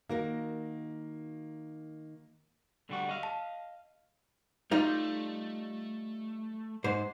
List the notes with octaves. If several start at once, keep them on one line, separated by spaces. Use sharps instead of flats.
D#3 A#3 F#4 A#4
D3 G3 F#4
D#5 F5
A5
G3 A3 D#4 F4
G#2 C5